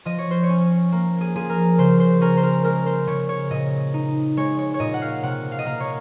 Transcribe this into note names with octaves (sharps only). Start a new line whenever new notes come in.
F3 D#5
C#5
C5
C#5
C#4
A#3
G#4
F3 G#4
A#4
C#3 C5
C5
C#4 A#4
C5
A#4
G#3 A#4
C5
C#3 C#5
C#5
A#2 D#5
D#4
G#3 C#5
C#5
C#5
A#2 D#5
F#5
F5
C3 F#5
F5
D#5
A#3 F5
C#5